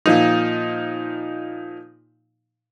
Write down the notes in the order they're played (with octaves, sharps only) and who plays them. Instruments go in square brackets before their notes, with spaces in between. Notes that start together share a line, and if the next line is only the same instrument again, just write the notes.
[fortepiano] A#2 F3 D#4